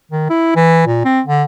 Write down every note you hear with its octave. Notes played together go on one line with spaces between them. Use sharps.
D#3
E4
E3
A#2
C4
D3